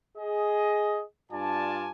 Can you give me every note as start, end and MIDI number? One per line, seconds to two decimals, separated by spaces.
0.17 1.02 68
0.17 1.02 75
1.32 1.90 43
1.32 1.90 62
1.32 1.90 65
1.32 1.90 74
1.32 1.90 80
1.32 1.90 81